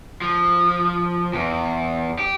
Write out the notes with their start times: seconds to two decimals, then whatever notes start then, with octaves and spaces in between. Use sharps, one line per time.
0.22 F3
1.34 E2
2.19 G4